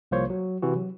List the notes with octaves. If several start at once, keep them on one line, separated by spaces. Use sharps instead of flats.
C2 F3 A#3 C5 C#5
F#3
C3 E3 F#4
F#3